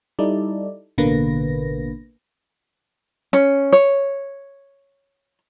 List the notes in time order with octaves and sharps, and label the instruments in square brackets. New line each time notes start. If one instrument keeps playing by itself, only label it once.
[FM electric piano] G3 D#4 E4 A4 D5
A1 B2 D3 A#3 B4 A#6
[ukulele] C#4
C#5